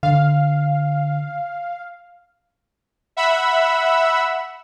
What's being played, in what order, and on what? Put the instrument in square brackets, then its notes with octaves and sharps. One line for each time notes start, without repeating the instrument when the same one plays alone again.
[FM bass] D3 [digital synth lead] F5
[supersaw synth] E5 F#5 B5 E6